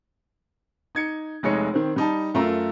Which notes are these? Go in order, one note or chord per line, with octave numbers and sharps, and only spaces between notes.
D#4 G#6 C#7
F1 G#3 A3 D#4 C#5 C#7
D#3 C4
G3 D#4 A5
F#2 A3 F4 A#4 A#5